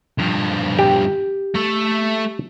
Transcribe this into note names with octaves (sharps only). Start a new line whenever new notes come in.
G2 F3
G4
A3 A4